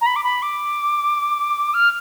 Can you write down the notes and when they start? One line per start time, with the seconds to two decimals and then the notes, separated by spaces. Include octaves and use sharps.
0.01 A#5
0.06 B5
0.16 D6
0.24 B5
0.42 D6
1.74 F6